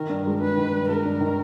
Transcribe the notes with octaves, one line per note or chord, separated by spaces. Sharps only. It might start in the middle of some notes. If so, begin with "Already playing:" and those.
Already playing: D#3 A#4
G2
G#3
G2 B4
D#3
G2
G#3 A#4
G2
D#3